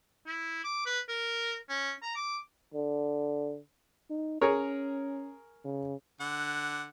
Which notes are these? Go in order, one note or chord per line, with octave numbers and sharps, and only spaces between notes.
E4
D6
B4
A#4
C#4
A#5
D6
D3
D#4
C#4 G#4 A#4 C#5
C#3
D3 F#5